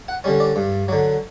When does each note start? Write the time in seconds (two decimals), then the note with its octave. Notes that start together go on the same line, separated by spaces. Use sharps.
0.09 F#5
0.24 D3 G3 C#4
0.40 D5
0.56 G2
0.88 D3 F#3